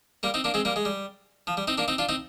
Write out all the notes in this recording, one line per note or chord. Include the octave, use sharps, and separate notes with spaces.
G3 A#3
C4 D#4
A#3 D4
G#3 C4
G3 A#3
G#3
G3
F3
G3
C4 D#4
A#3 D4
C4 D#4
D4 F4
C4 D#4